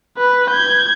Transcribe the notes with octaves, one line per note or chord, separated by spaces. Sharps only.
B4
G6 G#6